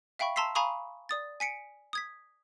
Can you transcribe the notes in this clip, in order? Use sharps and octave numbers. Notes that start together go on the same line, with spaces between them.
E5 F5 G5 B5 C#6
A5 A#5 C6 E6 B6 C7
F5 G#5 A#5 B5 C#6 D#6
D5 D#6 A6
G#5 B6 C#7 D7
D#6 G#6 B6